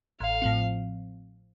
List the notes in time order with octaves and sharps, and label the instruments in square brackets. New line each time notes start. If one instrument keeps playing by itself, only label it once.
[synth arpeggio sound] A1 [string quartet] F5
[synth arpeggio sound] A2 F3 C4